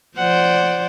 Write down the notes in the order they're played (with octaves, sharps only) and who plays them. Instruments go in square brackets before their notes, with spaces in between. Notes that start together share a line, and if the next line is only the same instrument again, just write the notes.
[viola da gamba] F3 C5 D5 [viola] F#5